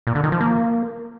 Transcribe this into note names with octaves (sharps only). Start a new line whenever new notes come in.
A#2
D3
D#3
F3
A#3